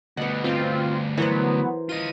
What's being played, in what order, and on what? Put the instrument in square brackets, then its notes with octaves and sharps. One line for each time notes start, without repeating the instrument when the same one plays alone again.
[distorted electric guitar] D2 G3 [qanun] B3 D#5 [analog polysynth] F#5
[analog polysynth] C4 F4
[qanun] E3 A#4 C5 [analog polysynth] F#3 B3
[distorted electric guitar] F4 D#5 [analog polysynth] D#7